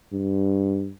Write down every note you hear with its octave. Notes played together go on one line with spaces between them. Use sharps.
G2